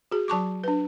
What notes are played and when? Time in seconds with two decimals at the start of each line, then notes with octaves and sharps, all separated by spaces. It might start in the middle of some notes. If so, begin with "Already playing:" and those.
0.11 F#4 G#4
0.28 F#3 A5 C#6 D6
0.64 D4 B4